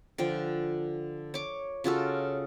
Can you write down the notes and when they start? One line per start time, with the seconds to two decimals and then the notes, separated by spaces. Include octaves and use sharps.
0.18 D3 F3 G5
1.34 C#5 D6
1.84 C#3 F4 F#4 A4